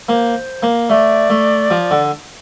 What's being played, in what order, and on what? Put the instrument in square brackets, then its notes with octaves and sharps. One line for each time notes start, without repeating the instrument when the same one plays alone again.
[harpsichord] A#3 [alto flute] C5
[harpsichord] A#3
[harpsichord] A3 [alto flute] D5
[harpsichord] A3
F3
D3